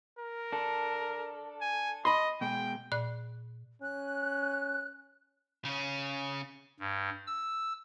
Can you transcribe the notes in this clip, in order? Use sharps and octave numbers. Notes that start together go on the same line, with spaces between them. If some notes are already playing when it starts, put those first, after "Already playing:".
A#4
D4 A4
G#5
D#5 B5 C6
B2 G#3 G#4 G5
A#2 D5 F#6
C#4 F#6
C#3 C#4
G2
E6